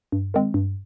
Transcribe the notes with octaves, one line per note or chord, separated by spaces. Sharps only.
G2
D#3 G#3 C4
G2